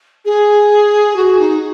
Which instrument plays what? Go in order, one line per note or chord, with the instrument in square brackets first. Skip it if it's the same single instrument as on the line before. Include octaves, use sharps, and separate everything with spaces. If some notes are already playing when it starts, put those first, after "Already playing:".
[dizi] G#4
F#4
D#4